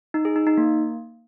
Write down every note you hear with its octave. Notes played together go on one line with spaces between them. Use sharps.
D#4
G#4
D#4
D#4
A#3